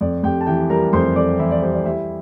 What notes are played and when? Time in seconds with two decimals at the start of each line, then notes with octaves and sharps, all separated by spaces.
0.01 F2 D5
0.23 F2 G4 G5
0.41 A5
0.47 E3 G4 G5
0.70 G3 A#4 A#5
0.93 F2 C5 C6
1.16 F2 D5 D6
1.39 E3 E4 E5
1.51 D5
1.62 G3 C5
1.74 D5
1.85 G3 E4 E5